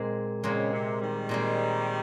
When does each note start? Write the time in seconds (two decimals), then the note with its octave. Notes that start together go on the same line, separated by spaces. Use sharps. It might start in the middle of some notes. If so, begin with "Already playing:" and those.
Already playing: A#2 G#3 C4
0.43 A#2 C#3 G#3 C4
0.73 C3
1.02 D#3 G3
1.29 A#2 G#3 C4